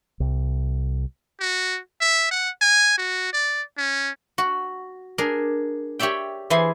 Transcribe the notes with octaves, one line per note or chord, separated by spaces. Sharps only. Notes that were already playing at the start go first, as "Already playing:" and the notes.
C2
F#4
E5
F#5
G#5
F#4
D5
C#4
F#4
D4 G#4 A#4
G4 C#5 D5 E5 G5
E3 E4 G#4 C5 G#5